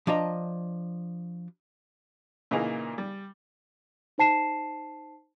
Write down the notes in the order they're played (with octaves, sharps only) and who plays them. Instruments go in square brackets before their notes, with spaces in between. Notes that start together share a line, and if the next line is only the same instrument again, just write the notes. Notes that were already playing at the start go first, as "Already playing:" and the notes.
[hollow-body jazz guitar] F3 D4 D#5 A#5
[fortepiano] A#2 C#3 E3 A#3 D#4 G#4
G3
[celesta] D#4 C5 A5 C7 E7